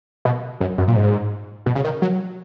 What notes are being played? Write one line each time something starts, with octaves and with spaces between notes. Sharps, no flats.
B2
F#2
F#2
A#2
G#2
B2
C#3
D#3
F#3